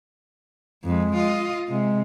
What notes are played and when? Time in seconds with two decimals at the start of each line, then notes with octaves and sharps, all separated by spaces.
0.84 F2 G#3
1.16 F4 D#5
1.68 C3 G#3